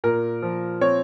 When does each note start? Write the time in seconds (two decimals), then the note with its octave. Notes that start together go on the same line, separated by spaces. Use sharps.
0.04 A#2 A#4
0.42 F3
0.81 C4 C#5